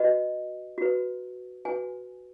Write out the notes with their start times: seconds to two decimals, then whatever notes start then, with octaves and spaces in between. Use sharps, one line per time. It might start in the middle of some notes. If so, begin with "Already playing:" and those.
Already playing: F#4 B4 D#5
0.78 F#4 B4
1.65 F#4 B4 G#5